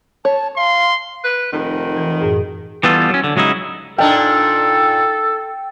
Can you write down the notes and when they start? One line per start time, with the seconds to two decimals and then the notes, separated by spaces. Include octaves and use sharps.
0.25 C#5 A5
0.57 F5 C6
1.24 B4
1.53 F1 D#3
1.97 E3
2.21 F#2 A2 G#4
2.83 E3 G3 B3 F4 A4
3.10 F#3 C#4
3.24 D3
3.36 C#2 F#3 G#3 D#4 E4
3.98 A#2 D4 D#4 A4 G5